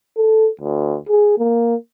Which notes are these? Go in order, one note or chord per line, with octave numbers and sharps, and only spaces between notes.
A4
D2
G#4
A#3